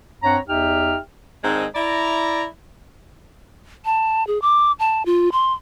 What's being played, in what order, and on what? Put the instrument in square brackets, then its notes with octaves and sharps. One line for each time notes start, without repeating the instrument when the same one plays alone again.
[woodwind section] G2 C4 C#5 F#5 A#5
E2 D#4 G4 E5 G5 F6
[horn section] G#2 D#3 G#3 C4 D4 D#4
E4 D5 A#5
[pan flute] A5
G#4
D6
A5
F4
C6